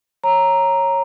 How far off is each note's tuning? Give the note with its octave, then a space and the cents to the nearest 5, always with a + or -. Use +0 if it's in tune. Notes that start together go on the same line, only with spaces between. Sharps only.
C#5 -15 A#5 +0